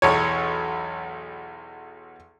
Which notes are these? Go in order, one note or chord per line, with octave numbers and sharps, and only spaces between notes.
B1 E2 C#5